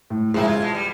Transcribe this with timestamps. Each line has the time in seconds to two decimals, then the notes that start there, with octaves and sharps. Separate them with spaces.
0.10 A2
0.34 C#2 F#2 F3 G#3 E4
0.48 F4 G#6
0.62 B2 G#3
0.75 G3